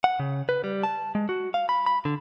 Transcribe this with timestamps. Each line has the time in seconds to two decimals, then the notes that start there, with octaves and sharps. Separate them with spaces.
0.04 F#5
0.20 C#3
0.49 B4
0.64 G3
0.83 A5
1.15 G#3
1.29 F#4
1.54 F5
1.69 B5
1.86 B5
2.05 D3